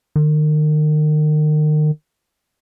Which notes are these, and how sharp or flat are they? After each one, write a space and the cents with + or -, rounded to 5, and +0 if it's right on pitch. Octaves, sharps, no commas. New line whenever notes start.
D#3 -35